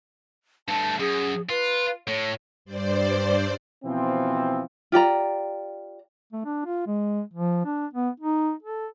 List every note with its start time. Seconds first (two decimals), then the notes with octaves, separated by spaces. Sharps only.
0.68 G2 A3 A5
1.00 F#2 G#4
1.50 F4 B4
2.07 A2 C#5
2.65 G2 C5 D5
3.84 B2 E3 F3 C4
4.92 F4 G4 D5 A#5
6.33 A3
6.45 D4
6.65 F4
6.87 G#3
7.33 F3
7.65 D4
7.93 B3
8.20 D#4
8.63 A4